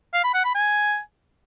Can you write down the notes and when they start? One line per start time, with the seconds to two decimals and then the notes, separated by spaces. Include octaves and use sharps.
0.13 F5
0.24 B5
0.34 F#5
0.44 B5
0.55 G#5